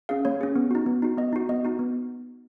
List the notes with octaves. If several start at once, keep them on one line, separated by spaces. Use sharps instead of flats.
C#4 G#4 F5
A#3 C#5
C#4 G#4
B3
D#4 F#4
B3
D#4 F#4
B3 D#5
D#4 F#4
B3 D#5
D#4 F#4
B3